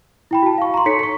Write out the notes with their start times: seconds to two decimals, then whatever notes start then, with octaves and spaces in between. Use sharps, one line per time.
0.31 E4 G5 B5
0.42 F#4 A5
0.58 F5 C#6
0.74 A#5 C6
0.86 D#4 A4 C#5 B6 C#7
0.99 C#6 B6